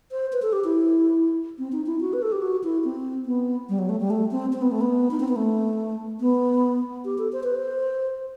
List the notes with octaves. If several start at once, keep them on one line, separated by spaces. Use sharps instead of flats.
C5
B4
A4
G4
E4
C4
D#4
E4
F#4
B4
A4
G4
F#4
E4
C4
B3
G3
F#3
A3
G3
A3
C4
C4
B3
A3
B3
D#4
C4
B3
A3
B3
G4
A4
C5
B4
C5